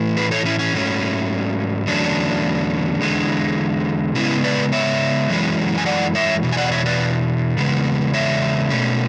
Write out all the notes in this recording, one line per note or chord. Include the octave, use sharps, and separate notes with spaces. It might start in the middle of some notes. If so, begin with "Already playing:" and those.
Already playing: A2 E3 A3
G#4 B4
A4 C#5
C#4 E4
C#4
G#2 F#3 A3 C#4
E2 D3 F#3 A3 C#4 D4
E2 D3 G#3
C#3 G#3 B3 C#4 E4
B4 D5
C#5 E5
F#2 E3 G#3 C#4
G#5
D5 F#5
C#5 E5
E2 B2
G#5
D5 F#5
D5
C#5 E5
B4 D5
E2 C#3 G#3 B3
C#5 E5
B2 A3 C#4